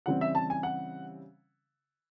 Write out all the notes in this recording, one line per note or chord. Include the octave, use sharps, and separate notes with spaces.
C#3 E3 G3 C4 F#5
E5
A5
G#5
F#5